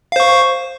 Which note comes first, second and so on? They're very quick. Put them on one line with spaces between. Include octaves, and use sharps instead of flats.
F5 C5 C#6